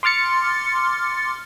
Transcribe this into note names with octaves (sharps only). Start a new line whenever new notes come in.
C6 D6 F6 A6 C#7